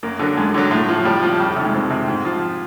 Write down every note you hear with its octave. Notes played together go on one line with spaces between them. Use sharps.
F#2 A#3
D3 F#3
F#2 G#3
D3 F#3
A2
F3
A2 G3
F3
F2 G3
C3 D#3 G3 G#3
F2 C4
C3 D#3
G#2
F3